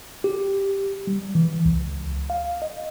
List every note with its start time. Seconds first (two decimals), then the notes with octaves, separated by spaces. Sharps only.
0.24 G4
1.07 G3
1.35 E3
1.65 C#2
2.30 F5
2.62 D#5